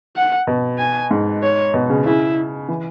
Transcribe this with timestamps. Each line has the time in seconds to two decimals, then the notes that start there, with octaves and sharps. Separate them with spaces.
0.16 F#5
0.47 B2
0.78 G#5
1.11 G#2
1.42 C#5
1.74 B2
1.90 C#3
2.05 C#3 E4
2.68 E3